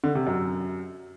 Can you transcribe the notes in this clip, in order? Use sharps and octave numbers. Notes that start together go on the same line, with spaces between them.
D3
C3
F#2